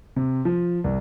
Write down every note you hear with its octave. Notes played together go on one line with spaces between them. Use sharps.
C3
F3
C2